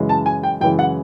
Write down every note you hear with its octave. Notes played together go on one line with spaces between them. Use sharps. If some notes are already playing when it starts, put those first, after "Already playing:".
Already playing: F#2 C#3 E3 G#3
A5
G#5
G5
F#2 C#3 E3 G#3 G5
F#5